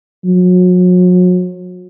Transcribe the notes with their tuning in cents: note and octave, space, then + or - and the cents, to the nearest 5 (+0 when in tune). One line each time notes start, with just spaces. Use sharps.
F#3 -35